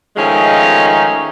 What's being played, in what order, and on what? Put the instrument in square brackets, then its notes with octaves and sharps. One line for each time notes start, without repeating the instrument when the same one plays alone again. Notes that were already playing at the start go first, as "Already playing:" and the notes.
[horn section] D#3 F3 G#3 A3 C#4 D#4